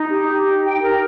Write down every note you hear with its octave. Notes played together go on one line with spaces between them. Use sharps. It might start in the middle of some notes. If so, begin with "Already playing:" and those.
Already playing: D#4
G4
G4
D#4
G5
A#4